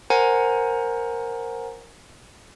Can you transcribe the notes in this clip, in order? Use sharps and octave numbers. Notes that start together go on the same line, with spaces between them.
A#4 C5 F#5 G#5 A#5